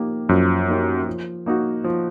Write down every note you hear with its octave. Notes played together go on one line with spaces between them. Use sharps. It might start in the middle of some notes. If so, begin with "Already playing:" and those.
Already playing: F3 A#3 D#4 G4
F#2 F3
A#3 D#4 G4
F3
A#3 D#4 F#4
F3